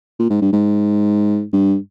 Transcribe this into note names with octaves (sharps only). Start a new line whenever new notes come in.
A#2
G#2
G2
G#2
G2